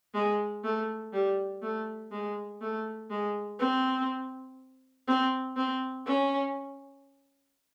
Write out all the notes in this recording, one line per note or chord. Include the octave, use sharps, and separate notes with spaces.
G#3
A3
G3
A3
G#3
A3
G#3
C4
C4
C4
C#4